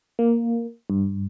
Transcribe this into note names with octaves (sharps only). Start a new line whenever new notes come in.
A#3
G2